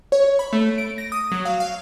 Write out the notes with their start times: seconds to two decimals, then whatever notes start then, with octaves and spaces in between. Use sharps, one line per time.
0.12 C#5
0.39 B5
0.53 A3
0.78 D7
0.98 A#6
1.12 D#6
1.32 F#3
1.45 F5
1.60 F5